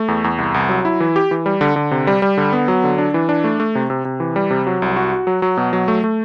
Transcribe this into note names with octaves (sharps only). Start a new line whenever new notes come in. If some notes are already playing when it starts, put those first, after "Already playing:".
Already playing: A3
E2
E2
C2
C2
F#3
E4
E3
G4
E3
G3
D3
D3
C3
G3
G3
D3
B3
F#3
D3
D4
E3
D4
A3
A3
C3
C3
C3
E3
G3
C3
F#3
C2
F#4
F#4
F#3
F#3
B2
F#3
A3
A3